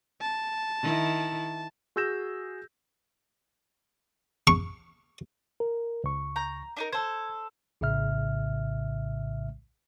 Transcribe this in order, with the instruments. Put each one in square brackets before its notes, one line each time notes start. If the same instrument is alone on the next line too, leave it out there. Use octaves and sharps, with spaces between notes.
[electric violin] A5
[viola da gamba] D#3 E4
[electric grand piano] F#4 G#4 E6 G6 A#6 E7
[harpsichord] C#6
[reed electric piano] A#4
C#2 C#6
[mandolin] A#5 G6
D4 D#4 A#4
[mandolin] A4 C5 [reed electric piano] G#6
[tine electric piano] A#1 A2 C#3 E5 F6